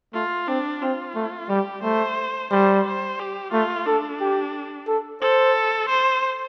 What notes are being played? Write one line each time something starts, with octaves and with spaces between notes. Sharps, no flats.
A3 F4
C4 D4
C4 F4
A3
G3 G4
A3 C5
G3 C5
C5
G4
A3 F4
D4 A4
G4
A4
A4 C5
C5